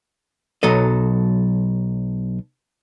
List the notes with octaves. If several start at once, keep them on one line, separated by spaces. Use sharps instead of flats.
B1 F#3 A4 D#5